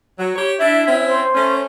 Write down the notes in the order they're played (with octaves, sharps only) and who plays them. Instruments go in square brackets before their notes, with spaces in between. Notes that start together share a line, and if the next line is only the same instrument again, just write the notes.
[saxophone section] F#3
G4 C#5
[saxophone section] D4 E4 [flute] E5
[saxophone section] C4 C#4 E4
[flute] C5
[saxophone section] A3 C#4